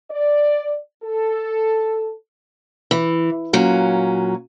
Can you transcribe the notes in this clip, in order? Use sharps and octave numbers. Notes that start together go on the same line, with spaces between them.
D5
A4
E3
A#2 F#3 C#4